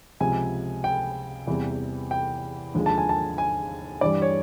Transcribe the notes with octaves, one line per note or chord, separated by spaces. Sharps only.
C#2 C3 F3 G#5
G5
E2 C3 E3 G3
G5
D#2 D3 F3 G#3
A5
G#5
A5
G#5
G2 E3 G3 D5
C#5